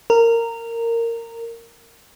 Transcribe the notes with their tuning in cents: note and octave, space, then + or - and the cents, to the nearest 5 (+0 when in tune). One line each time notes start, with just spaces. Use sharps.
A#4 -15